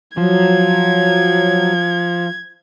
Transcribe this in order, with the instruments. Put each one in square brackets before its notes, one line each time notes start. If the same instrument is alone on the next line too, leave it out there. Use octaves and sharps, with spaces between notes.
[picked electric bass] F3 [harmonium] F#3 [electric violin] G#6